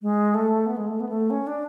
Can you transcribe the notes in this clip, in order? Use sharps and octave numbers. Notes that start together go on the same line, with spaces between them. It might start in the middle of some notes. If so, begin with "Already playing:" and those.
G#3
A3
B3
G#3
A3
B3
A3
C#4
D4